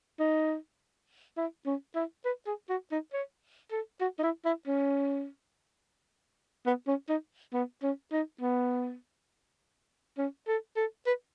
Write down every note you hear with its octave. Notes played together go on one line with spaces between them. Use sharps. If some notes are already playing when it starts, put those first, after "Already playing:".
D#4
E4
C#4
E4
B4
G#4
F#4
D#4
C#5
A4
F#4
D#4
E4
E4
C#4
B3
C#4
D#4
B3
C#4
D#4
B3
C#4
A4
A4
B4